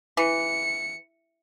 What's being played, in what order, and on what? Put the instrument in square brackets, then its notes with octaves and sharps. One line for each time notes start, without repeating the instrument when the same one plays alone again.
[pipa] E3 [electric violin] C#7